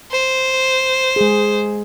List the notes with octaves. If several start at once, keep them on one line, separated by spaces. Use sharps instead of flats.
C5
G#3 G#4